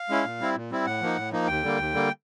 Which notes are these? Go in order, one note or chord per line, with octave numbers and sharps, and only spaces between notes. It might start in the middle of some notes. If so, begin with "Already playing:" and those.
Already playing: F5
G#3 C#4 E4
A#2
G3 C4 E4
A#2
G3 C4 E4
A2 F#5
F3 A#3 D#4
A2
F3 A#3 D#4
D#2 G5
D3 G3 A#3
D#2
D3 G3 A#3